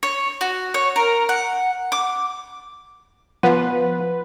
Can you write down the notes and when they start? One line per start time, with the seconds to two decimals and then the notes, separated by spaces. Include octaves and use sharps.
0.03 C#5
0.41 F#4
0.74 C#5
0.96 A#4
1.29 F#5
1.92 D6
3.43 F3 B3 F4 B4 F#5